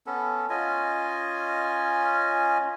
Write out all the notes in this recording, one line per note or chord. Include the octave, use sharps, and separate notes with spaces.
B3 C#4 A4
C#4 F4 D#5 G#5